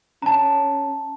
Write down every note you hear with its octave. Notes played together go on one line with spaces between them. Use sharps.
C#4 A5 A#5